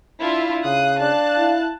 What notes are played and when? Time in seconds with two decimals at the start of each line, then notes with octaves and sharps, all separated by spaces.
0.21 D4 E4 F4
0.65 C#3 F5 D#6 F#6
1.01 D4 A5 F#6
1.38 E4